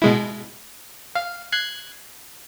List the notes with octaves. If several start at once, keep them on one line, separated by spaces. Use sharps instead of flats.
B2 G#3 E4
F5
F#6 G#6 C7